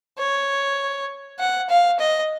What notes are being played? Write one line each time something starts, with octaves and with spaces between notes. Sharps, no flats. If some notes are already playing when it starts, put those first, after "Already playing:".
C#5
F#5
F5
D#5